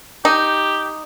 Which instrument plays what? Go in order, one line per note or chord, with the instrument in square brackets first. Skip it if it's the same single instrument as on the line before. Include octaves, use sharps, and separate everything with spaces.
[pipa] D#4 [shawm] G4